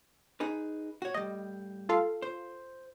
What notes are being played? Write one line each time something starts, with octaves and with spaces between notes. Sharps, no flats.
D#4 G#4 B4
F#4 C#5
A2 G3 D#5
F4 A4 F5
C5